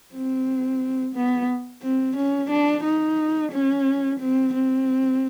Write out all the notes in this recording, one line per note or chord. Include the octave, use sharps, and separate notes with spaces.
C4
B3
C4
C#4
D4
D#4
C#4
C4
C4